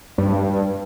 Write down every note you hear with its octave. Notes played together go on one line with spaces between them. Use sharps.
G2